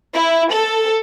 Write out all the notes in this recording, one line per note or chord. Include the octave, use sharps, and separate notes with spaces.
E4
A4